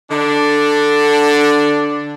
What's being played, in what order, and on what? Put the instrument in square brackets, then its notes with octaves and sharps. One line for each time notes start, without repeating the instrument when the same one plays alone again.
[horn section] D3 D4